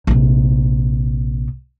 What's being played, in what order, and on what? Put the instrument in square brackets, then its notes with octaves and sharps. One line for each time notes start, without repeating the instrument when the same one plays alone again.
[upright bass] A#1 C3